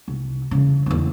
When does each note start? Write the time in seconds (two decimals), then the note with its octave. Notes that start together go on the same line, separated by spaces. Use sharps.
0.08 C2
0.51 E2 C#3
0.86 E2 A#3